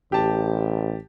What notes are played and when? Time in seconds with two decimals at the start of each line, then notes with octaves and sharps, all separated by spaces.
0.12 A1 G4 A5